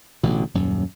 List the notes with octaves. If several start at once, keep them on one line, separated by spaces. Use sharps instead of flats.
A1 B2 D3
D#1 F#2